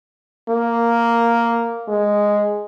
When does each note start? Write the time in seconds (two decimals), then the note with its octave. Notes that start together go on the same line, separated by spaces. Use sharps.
0.49 A#3
1.88 G#3